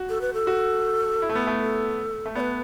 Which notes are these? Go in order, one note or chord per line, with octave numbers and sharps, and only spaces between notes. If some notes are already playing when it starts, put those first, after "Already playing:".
Already playing: F#4
A4
B4
A4
F#4
E4
A3
B3
A3
A4
A3
B3 B4 D5